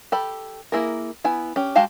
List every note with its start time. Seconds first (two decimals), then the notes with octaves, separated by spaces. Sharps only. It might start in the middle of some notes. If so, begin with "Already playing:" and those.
0.12 G4 A4 B5
0.72 A#3 D#4 E4 G#4 A#4
1.24 B3 E4 G#5
1.56 C#4 G4
1.75 G#3 F#4 G4 F5 A5